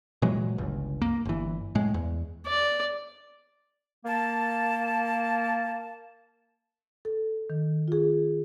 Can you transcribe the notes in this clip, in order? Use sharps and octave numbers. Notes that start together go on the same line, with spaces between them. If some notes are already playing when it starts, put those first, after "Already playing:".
A#2 E3 F#3 G#3
G1 C#2
A#3
G1 E3
A2 G#3
E2
D5
A#3 A5
A4
D#3
F4 G#4